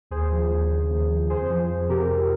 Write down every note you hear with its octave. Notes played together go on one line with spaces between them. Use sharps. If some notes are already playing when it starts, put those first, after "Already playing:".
D#2 G#4 C5
F3
D#2
C#3
D#2
F3
F2 G#4 C5
F3
F2
C3 G4 A#4
F2